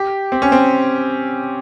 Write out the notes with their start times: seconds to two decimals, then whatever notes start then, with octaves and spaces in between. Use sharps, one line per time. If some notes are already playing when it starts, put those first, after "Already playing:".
Already playing: G4
0.32 C4
0.42 C#4
0.52 C4